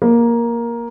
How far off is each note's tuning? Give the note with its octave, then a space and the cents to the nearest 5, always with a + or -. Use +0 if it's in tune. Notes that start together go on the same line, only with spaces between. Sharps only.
A#3 +10